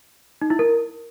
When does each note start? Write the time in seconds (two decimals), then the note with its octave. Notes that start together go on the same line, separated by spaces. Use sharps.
0.42 D#4
0.50 E4
0.59 A#4